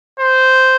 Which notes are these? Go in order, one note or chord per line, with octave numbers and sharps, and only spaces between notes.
C5